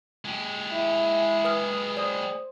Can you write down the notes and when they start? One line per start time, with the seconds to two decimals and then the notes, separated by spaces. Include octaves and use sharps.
0.25 G#3 G4
0.72 E4
1.45 B4 D#6 F6
1.97 C5 D5 D#6